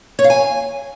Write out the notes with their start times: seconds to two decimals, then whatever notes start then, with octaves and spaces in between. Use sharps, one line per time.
0.19 C#5
0.24 F5
0.30 G#5